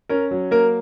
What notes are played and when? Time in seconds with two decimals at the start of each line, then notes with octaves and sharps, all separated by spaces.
0.09 C#4 A#4
0.31 F#3
0.51 A#3 A#4